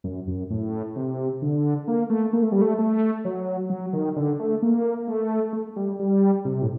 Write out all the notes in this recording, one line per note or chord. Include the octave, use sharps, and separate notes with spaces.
F#2
F#2
A2
C3
D3
A#3
A3
A#3
A3
G3
A3
A3
F#3
F#3
D#3
D3
A3
A#3
A3
A3
G3
G3
C3
A2